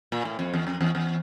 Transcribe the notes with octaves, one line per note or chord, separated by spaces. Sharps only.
A#2
A2
F2
E2
F2
E2
E2